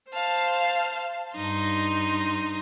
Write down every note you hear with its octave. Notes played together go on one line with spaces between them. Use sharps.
C5 F5 A5
G2 D#4 C6